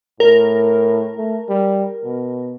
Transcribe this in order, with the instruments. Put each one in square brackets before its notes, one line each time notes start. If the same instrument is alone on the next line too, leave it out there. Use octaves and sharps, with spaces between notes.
[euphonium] A2 [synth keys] A#4
[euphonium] A3
G3
B2